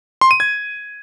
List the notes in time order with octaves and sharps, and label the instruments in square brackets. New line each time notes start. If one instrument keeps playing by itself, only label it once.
[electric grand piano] C6
D#7
G#6